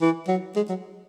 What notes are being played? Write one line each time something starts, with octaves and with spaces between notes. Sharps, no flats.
E3
F#3
G#3
F#3